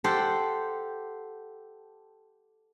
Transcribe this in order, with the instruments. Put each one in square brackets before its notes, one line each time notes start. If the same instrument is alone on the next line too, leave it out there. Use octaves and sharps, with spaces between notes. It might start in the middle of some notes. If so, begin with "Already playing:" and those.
[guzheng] G4 A4 C5 F#5 G5